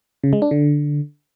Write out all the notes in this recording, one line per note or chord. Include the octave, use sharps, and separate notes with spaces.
C#3
G#3
D4
D3